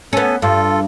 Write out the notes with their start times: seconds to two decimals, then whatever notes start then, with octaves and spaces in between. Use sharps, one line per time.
0.13 B3 C#4 A4 G#5
0.42 G2 F4 A4